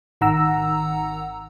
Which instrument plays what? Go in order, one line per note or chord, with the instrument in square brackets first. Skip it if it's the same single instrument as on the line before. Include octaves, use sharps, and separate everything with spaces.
[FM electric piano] G#1 D#3 F#5 A#5 E6